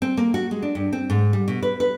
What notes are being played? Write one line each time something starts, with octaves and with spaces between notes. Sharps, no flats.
C4
A#3
F#4
G#3
D4
G2
C4
G#2
G3
B2
B4
B4